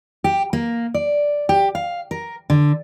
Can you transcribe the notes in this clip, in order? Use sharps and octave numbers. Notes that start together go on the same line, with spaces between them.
G4
A#3
D5
G4
F5
A#4
D3